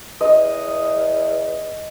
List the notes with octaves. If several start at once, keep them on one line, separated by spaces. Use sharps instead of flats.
E2 D#5